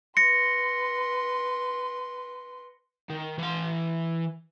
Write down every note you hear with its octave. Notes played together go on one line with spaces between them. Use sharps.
B4 C6 A#6 C#7
D#3
E3 C6